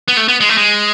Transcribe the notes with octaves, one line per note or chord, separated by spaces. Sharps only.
B3
A3
B3
G#3
A3
G#3